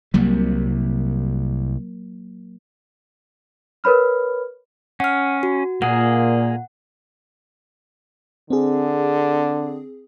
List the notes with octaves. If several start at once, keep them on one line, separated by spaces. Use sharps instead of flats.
C2 C3 F#3 G3 A#3
A#4 B4 C#5 B5 F6
C#4 F#5 F6
F#4
A#2 A#3 G#4 F#5
D3 C4 G#4